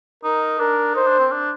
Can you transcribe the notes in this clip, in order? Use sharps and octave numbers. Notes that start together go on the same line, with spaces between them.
D#4 A#4
D4 A#4
D#4 C5
D4
C4
D4